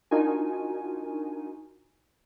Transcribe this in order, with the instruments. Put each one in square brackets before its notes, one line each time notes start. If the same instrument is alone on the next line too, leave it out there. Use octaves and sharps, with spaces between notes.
[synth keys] D4 D#4 F4 F#4 A#4 G#5